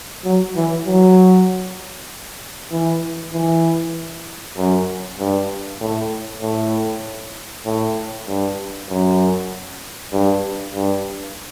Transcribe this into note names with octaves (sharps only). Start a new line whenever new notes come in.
F#3
E3
F#3
E3
E3
F#2
G2
A2
A2
A2
G2
F#2
G2
G2